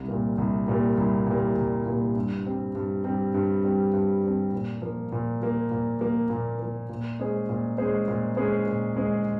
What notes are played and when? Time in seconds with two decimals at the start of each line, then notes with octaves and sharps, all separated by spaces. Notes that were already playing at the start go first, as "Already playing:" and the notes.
Already playing: C2
0.08 A#2 G3 A#3
0.38 C2
0.68 A#2 G3 A#3
0.98 C2
1.27 A#2 G3 A#3
1.57 C2
1.86 A#2 G3 A#3
2.16 G2
2.45 G3 C4
2.75 G2
3.04 G3 C4
3.34 G2
3.64 G3 C4
3.93 G2
4.23 G3 C4
4.53 A#2
4.82 F3 A#3
5.12 A#2
5.41 F3 A#3
5.71 A#2
6.01 F3 A#3
6.30 A#2
6.60 F3 A#3
6.89 A#2
7.19 G#3 C#4 G#4 C5
7.49 A#2
7.78 G#3 C#4 G#4 C5
8.08 A#2
8.37 G#3 C#4 G#4 C5
8.66 A#2
8.96 G#3 C#4 G#4 C5